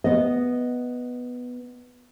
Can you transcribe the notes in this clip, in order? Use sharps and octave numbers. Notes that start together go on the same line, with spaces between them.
B3 D#5